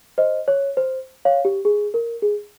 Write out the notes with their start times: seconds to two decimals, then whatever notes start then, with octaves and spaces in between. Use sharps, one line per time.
0.18 C5 D#5
0.48 C#5
0.77 C5
1.25 C#5 F5
1.45 G4
1.65 G#4
1.94 A#4
2.22 G#4